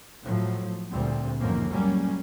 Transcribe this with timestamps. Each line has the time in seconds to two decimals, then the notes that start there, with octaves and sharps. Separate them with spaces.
0.23 A2 F3 F#3
0.90 D2 A#2 G3 C4
1.40 C#2 F#2 A2 D#3 F3 A#3
1.70 F#3 G3 A#3 C#4